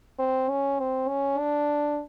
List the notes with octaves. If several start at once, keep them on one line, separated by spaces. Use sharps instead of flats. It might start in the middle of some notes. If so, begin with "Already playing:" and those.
C4
C#4
C4
C#4
D4